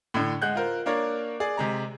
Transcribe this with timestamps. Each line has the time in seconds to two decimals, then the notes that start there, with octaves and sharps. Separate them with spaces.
0.14 A2 D3
0.42 G#3 F#5 F#6 G6
0.55 F4 A#4 C5
0.86 A#3 D4 A#4 C#5 D5
1.40 G#4 D5
1.57 C3 G#3 A#5